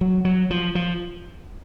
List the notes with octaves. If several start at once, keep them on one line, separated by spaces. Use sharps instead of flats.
F#3
F#3
F3
F3